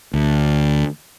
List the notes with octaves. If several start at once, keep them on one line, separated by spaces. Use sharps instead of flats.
D2